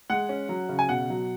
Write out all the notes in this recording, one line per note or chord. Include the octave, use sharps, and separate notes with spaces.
G#3 F#5
C#4
F#3
C#3
G#5
B2 F#5
F#3